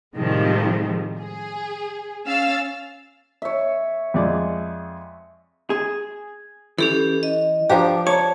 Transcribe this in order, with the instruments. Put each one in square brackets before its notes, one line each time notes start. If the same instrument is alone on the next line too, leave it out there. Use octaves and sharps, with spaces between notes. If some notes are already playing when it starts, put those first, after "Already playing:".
[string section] A2 C3 D#3 F3 G3 G#3
G#4
C#4 F5 E6 A6
[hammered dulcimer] C#5 E5
[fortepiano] F2 G#3 D5
[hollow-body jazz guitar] G#4
[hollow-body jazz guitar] E3 [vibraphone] C#4 G4 A4
[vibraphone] D#5
[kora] F3 D4 G4 [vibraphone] A#5 D6
[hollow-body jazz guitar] C#5 [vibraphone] A5